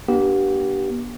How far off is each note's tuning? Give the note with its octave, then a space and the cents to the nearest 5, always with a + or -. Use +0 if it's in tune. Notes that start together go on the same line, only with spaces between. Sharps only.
B3 -45 D4 +0 G4 -20